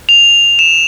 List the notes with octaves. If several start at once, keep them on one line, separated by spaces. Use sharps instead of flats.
F7
E7